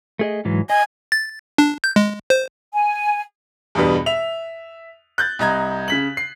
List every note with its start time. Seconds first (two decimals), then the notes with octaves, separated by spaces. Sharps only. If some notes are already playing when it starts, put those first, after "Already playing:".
0.19 A3 G#4 D#5
0.45 G#2 E3 F#3
0.70 D#5 G#5
1.12 A6
1.58 D4
1.84 G6
1.96 G#3
2.30 C5
2.73 G#5
3.75 E2 G2 B2 G3 B3
4.06 E5 F7
5.18 F#6 G6 A6
5.39 C2 D#5 A#5 G#6
5.88 C#3 B6 F#7
6.17 C7